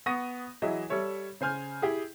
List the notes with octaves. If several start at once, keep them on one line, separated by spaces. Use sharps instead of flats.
B3 C#6 D#6 A#6 D#7
E3 F#3 E4 G#4 D#5 E5
G3 A4 C#5 E5
C#3 C5 G#5 F6 G6
E4 G4 G#4